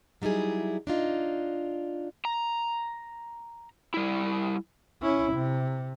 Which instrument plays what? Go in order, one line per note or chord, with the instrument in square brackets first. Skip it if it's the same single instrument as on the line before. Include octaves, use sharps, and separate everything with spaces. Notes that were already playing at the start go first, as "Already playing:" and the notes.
[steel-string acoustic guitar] F#3 G3 D#4 E4 G#4
D4 D#4 F4
[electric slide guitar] A#5
G3 E4
[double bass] C#4 E4
C3